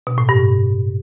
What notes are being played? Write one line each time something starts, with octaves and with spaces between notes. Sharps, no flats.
B2
A2
G2